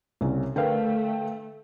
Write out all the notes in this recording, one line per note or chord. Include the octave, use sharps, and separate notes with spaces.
C2 C#3 C#4
D3 A3 A#4 B4 F5 G5